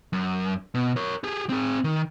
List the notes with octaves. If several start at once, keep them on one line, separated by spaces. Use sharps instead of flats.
F#2
B2
A#4 C#5
G4 G#4
C4 G#4
D#3